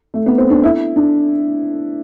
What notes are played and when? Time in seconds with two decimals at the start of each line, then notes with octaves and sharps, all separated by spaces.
0.14 A3
0.26 B3
0.38 C4
0.50 D4
0.63 E4
0.96 D4